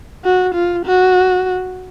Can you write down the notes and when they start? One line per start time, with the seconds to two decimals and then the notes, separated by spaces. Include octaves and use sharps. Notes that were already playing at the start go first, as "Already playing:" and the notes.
0.25 F#4
0.55 F4
0.85 F#4